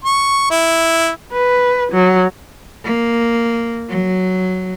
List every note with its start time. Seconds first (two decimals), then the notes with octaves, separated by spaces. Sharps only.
0.04 C#6
0.51 E4
1.32 B4
1.92 F#3
2.84 A#3
3.89 F#3